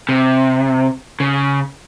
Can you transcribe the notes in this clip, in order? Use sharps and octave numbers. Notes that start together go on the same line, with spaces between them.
C3
C#3